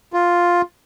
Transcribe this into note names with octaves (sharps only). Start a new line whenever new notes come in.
F4